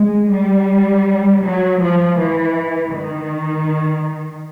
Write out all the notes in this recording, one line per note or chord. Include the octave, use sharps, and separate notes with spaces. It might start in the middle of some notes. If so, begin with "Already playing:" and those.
Already playing: G#3
G3
F#3
F3
E3
D#3